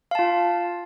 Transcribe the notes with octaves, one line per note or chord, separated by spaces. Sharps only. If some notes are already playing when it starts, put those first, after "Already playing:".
F4 F5 A5